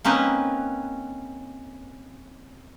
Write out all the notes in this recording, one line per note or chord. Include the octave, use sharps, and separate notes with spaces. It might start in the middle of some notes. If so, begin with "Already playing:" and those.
A#3 C4 C#4 D#4 B4